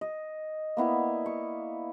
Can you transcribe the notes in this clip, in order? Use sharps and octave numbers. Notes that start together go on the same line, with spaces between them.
D#5
A#3 B3 E4 D5
C#6